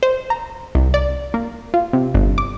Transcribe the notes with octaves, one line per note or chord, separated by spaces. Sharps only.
C5
A#5
C2
D5
A#3
F4
C3
G1
D6